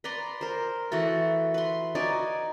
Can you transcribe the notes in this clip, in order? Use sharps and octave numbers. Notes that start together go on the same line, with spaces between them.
B4 D5 A#5 C6
A#4 C5
E3 A3 F#4 A4
B4 C6
D#4 F#4 D5 G#5